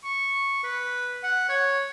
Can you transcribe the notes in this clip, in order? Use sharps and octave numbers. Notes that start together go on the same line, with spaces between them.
C#6
B4
F#5
C#5